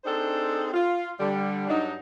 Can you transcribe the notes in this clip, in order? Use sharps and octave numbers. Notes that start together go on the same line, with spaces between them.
C4 D4 D#4 G#4 A4 C5
F4
D3 G3
G2 F#3 D4 D#4